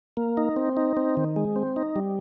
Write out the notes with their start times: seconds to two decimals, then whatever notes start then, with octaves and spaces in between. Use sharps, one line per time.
0.17 A#3
0.37 D#4
0.56 C4
0.77 D#4
0.97 C4
1.17 D#3
1.36 G#3
1.56 C4
1.76 D#4
1.96 G3